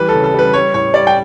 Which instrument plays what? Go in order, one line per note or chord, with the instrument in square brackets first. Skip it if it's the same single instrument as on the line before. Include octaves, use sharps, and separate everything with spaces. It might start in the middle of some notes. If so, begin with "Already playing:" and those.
Already playing: [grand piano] E3 G3 B4
A4
C#3
A4
G3 B4
G3 C#5
A2 C#5
G3 D5
G5